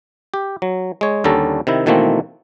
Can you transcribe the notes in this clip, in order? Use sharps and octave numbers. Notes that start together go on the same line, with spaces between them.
G4
F#3
G#3 C#5
D#2 D3 G3 C#4 A4 A#5
C3 D#3 E4
B2 D#3 E3 A3 A#3 C4